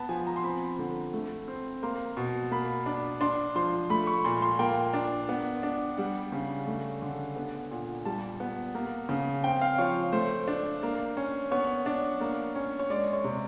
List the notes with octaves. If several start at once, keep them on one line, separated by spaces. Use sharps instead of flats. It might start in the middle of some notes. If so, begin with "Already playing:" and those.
Already playing: B3 A5 B5
F3 G#5
A#5
C6
C4 B5
D3
A3
C4
A#3 C6
B2
A#3 B5
D4
D4 C6
F3 C6
A3 B5
C#6
A#2 C6
C6
A#3 G5
D4
B3
D4
G3 F#5
C#3
A3
D3
B3
A#2
G3 A5
B3
A#3
C#3
C4 G5
F5
F3 C#5
A3 C5
D4
A#3
C#4
B3 C#5
D4
A#3
C#4
C#5
G#3 D5
C#5
C3